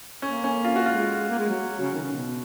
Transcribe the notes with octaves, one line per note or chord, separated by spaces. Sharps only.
A#3 C#4
C#4
F4
F#4
G#3 F4
A#3
G#3
F#3
C#3
D#3
C#3
B2